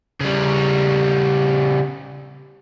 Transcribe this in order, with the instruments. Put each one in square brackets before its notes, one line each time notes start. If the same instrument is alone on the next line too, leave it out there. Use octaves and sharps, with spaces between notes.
[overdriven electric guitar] C#3 G3